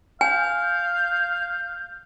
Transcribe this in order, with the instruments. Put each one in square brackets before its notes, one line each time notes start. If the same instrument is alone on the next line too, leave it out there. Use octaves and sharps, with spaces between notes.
[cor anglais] F5 [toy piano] G#5 [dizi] G6